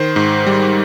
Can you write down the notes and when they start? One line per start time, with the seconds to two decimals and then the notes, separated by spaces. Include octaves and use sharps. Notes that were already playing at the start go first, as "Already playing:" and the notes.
Already playing: D#3 C5
0.16 G#2
0.46 G3